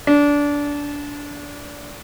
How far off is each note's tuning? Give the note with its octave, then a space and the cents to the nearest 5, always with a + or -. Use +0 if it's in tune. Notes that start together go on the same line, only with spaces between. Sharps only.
D4 -20